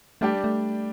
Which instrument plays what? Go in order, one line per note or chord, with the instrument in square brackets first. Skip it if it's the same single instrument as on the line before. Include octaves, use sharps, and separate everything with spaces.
[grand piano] G3 D4 G4 [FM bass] A3
[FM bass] A3